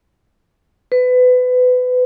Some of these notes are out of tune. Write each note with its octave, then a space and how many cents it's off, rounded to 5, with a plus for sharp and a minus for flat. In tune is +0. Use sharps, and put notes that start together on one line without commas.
B4 +25